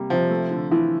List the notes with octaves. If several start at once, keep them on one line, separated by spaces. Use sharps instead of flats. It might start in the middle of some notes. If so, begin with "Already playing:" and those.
Already playing: C3 G3 A#3
C3 F3
A3
D3
E3 F3